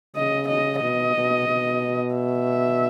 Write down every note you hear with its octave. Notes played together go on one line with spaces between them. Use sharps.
C#3 D#5
D#5
B2 D#5
B2
B2
E5